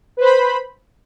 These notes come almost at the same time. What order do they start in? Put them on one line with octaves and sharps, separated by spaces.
B4 C5 B5